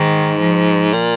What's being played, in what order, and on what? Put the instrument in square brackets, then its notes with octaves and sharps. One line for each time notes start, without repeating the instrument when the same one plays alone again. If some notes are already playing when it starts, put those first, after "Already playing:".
Already playing: [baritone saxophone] G#2 [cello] D#3
[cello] F3
[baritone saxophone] A#2